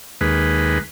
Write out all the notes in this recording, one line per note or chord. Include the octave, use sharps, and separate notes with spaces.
D#2 G#3 B4